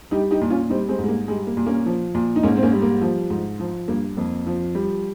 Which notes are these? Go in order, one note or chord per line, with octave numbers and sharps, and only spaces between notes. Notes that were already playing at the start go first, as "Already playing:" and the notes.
G3 D#4 G4
D#4 G4
A#2
C#4 F4
G3 C4 D#4
G#3 C4
G#2
G#3
A#3
G3 G#3
A#3
A#2
A#3 C#4
F3
A#2
D#4
G#2 A#3 C#4
C4
A#3 C#4
G3
A#3
F3
G#2
F3
G2 A#3
F2 A#3
F3
G3